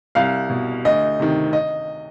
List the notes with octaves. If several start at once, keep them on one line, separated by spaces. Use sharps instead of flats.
C2 F5
B2
D2 D#5
C3 D#3
D#5